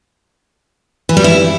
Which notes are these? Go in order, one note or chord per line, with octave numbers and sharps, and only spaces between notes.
E3
G3
E4